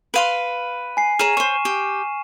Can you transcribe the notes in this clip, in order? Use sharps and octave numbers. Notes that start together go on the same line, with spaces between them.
B4 F5 C6 D7 D#7
G#5 C7
G#4 C#5 A#5 F6 D#7 E7
C5 C#5 C#6
G4